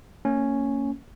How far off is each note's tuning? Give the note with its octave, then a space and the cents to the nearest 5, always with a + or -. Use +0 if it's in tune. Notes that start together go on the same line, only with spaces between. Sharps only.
A#3 -25 C#4 +0